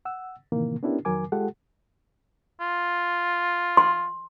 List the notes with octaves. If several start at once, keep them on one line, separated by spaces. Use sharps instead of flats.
F#5 E6
A2 C3 D#3 E3 A#3
B3 C#4 D4 E4 G4 A#4
F2 D#3 F#3 A#4 G#5 D6
G#3 F4 G4 A4 F#5
F4
C6